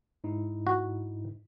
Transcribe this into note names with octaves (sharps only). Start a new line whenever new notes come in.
G#2 D#4 E4
F#4